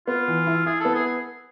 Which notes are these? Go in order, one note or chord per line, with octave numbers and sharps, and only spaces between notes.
B3 F4
E3
E4
E4 G#4
B3 A4
G#4